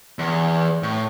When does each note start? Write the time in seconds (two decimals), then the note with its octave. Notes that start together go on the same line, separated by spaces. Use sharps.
0.19 E2
0.83 A2